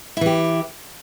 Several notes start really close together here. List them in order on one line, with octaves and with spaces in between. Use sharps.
E4 E3 G4